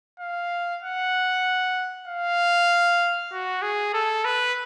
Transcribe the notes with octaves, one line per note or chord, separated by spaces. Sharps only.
F5
F#5
F5
F#4
G#4
A4
B4